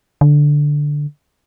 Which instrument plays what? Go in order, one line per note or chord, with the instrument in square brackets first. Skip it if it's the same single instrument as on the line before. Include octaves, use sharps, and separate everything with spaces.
[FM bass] D3